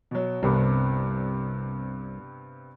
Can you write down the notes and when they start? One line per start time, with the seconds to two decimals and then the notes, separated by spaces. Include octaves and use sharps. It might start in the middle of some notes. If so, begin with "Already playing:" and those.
0.11 B2 F#3
0.43 C2 G2 C3 B3